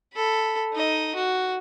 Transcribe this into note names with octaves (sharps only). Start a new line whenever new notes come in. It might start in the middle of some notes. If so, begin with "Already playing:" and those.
A4 B5
D#4 D#5
F#4